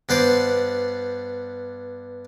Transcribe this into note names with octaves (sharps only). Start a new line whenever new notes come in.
G2 B3 C5 D5